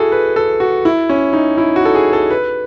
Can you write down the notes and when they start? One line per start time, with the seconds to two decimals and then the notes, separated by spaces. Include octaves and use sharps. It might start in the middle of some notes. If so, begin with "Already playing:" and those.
Already playing: E4 F#4 G#4 A4
0.12 B4
0.36 A4
0.60 F#4
0.85 E4
1.09 C#4
1.33 D#4
1.58 E4
1.76 F#4
1.85 A4
1.95 G#4
2.13 A4
2.31 B4